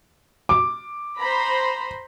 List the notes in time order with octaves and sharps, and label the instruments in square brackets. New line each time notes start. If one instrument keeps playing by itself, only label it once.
[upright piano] D6
[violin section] C5 A#5 B5